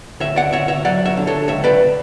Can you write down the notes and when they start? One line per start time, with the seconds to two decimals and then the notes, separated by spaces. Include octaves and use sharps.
0.20 D2 C#5 E5
0.36 D5 F#5
0.52 D2 C#5 E5
0.68 C#5 E5
0.85 F#3 D5 F#5
1.06 C#5 E5
1.17 D3
1.27 A4 C#5
1.48 C#2 C#5 E5
1.64 B4 D5